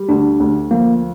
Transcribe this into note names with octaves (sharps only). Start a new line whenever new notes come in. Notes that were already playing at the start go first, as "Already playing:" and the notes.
Already playing: G3
D2 D4
D2
F3 A#3